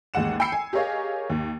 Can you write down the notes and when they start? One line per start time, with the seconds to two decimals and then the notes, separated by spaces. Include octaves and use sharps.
0.14 A1 D#2 G#3 F#5 E7
0.40 G5 B5 E6 C7 C#7
0.52 G#5
0.73 G4 G#4 A#4 C#5 D#5 F5
1.30 D#2